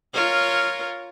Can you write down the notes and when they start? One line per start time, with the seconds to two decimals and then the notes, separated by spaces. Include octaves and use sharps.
0.14 F4 A#4 C#5